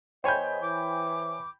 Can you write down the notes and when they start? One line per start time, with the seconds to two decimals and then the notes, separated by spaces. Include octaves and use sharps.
0.24 E2 C5 C#5 D#5 G5 G#5 B5 G6
0.61 E3 D6